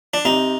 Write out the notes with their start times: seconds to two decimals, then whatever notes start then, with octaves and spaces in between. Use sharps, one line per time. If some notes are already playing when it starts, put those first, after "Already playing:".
0.14 D4
0.25 C3 D#4